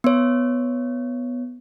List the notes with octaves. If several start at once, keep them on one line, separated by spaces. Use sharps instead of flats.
B3 C#5